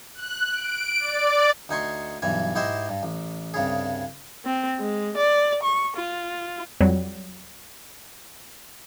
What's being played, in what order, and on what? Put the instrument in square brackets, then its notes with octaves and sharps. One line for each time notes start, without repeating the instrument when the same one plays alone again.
[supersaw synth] F#6
D7
D5
[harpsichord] D2 D#4 G#5 C6 C#6
B1 G2 E3 G#5
G#2 E4 G4 D#5 E5 C6
G2
A1
C2 G2 C#3 G#4
[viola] C4
G#3
D5
C#6
F4
[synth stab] F2 F#3 G3